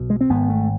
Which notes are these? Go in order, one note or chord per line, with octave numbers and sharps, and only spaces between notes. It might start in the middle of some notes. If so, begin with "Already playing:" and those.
Already playing: B1 B2
G#3
C4
G#1 G#2 B3
A3